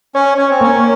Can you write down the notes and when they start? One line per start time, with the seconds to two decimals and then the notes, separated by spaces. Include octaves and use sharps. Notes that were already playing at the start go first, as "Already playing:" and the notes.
0.15 C#4 C#5
0.38 C#4 C#5
0.50 C4
0.61 A#3 C#4